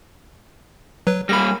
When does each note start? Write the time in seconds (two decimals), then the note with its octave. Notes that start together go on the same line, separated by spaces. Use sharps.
1.07 F#3 B4
1.29 G3 A#3 B5 A#6